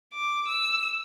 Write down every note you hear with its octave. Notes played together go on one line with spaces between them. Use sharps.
D6
E6